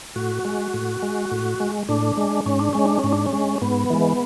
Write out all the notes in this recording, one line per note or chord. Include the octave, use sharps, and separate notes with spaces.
A2 F#4
G#3
A2
G#3
A2
G#3
A2 D4
G#3
G#2 C#4
D4
G#3 C#4
D4
G#2 C#4
D4
C#4
G#3
G#2 B3
E3 G#3